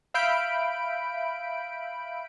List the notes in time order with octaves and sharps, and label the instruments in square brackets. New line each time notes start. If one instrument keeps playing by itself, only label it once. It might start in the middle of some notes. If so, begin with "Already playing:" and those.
[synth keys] E5 F5 B5 G6 D7